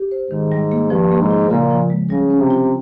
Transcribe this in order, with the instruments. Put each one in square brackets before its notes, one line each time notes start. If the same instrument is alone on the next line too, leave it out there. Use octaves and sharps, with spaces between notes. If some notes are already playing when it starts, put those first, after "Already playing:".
Already playing: [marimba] G4
C5
[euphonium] G#2 [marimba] D#3
[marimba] G3
A#3
[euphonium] G2 [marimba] F3
[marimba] A#3
[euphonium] G#2
[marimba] F4
[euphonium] A#2 [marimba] C#3
[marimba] F3
G#3
[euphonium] C#3 [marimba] G3
[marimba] C#4
[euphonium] C3
[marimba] F4